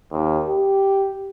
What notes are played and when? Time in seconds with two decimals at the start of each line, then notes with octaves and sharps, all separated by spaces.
0.12 D#2
0.48 G4